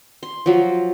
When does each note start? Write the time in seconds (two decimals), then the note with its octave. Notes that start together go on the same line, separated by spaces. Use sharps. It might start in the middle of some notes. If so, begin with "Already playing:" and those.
0.23 C6
0.46 F3 F#3